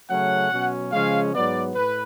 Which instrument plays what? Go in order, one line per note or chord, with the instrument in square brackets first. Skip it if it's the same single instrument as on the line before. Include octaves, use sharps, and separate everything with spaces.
[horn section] C#3 F#3 A3 C#4 F#5
B2 F#3 C#4
C#3 F3 G#3 C#4 F5
G#2 F#3 B3 D5
A2 B4